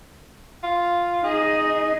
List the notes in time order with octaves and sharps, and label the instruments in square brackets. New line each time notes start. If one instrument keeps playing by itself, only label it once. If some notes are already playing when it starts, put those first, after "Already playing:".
[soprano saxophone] F4
[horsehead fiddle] D#4 D#5 [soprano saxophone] G#4